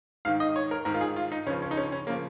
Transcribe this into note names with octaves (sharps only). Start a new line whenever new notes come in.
G#2 D#3 F5
D#5
C#5
A#4
G#2 D#3 A#4
F4
G#4
F4
D#4
C#2 C#3 F3 C#4
C#4
D#4
C#4
C#4
C#3 F3 A#3